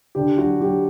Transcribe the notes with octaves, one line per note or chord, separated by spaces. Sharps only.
D3 G4
F#3 F#4
F#3 G4